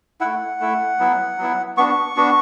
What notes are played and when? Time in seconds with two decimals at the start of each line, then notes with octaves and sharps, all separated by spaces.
0.21 A3 E4 F#5
0.60 A3 E4
0.99 F#3 B3 E4
1.38 F#3 B3 E4
1.77 B3 D4 F#4 C#6
2.16 B3 D4 F#4